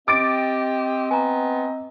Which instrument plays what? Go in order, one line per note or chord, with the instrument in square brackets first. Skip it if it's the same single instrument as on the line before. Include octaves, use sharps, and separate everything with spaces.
[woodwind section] C4 D#5 [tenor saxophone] G4 [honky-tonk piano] D6 A6 D7
[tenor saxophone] B3 [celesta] G#5 A#5